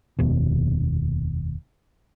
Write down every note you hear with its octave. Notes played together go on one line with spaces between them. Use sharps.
F1 D#2 B2